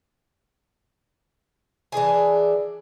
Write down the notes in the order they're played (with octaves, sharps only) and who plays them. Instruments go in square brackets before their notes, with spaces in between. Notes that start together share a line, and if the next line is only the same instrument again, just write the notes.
[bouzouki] E3 D4 G#4 G#5